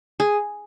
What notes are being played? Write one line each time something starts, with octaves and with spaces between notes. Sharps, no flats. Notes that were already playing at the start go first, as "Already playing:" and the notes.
G#4